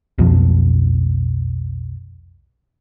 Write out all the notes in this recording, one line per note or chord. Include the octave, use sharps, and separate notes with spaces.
B1 F2 B2 F3